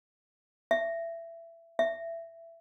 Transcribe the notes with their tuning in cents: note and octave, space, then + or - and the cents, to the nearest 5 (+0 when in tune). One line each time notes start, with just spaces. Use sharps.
E5 +20
E5 +15